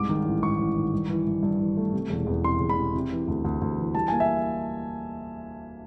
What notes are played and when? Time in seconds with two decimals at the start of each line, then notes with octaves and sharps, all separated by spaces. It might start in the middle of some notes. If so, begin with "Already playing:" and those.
Already playing: C2 G#2 D6
0.09 D#3
0.25 A1
0.42 G#2 C#6
0.59 A1
0.76 D#3
0.93 G2
1.09 E3
1.27 G2
1.43 G2
1.60 E3
1.77 A3
1.93 C3
2.10 E1
2.26 E2
2.44 C3 C6
2.61 E1
2.69 B5
2.77 C3
2.95 C3
3.12 E3
3.28 D2
3.44 D2
3.62 D2
3.78 E3
3.95 G3 A5
4.08 A#3 G#5
4.20 E5